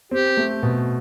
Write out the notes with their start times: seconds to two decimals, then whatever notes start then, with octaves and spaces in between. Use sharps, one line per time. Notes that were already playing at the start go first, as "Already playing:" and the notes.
0.11 C4 G4
0.37 A3
0.63 B2